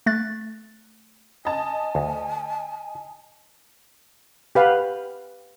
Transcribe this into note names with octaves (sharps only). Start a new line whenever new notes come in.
A3 F#6 A6
D#5 G#5 A5
D2
G4 B4 F5 F#5